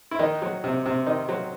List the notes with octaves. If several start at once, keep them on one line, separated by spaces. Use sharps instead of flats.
E4
D#3 D#4
F#3
C3
C3
D#3 D#4
F#3